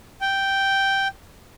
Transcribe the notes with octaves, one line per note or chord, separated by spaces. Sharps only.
G5